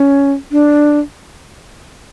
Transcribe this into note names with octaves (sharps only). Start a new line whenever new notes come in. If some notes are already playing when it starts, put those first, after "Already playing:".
Already playing: C#4
D4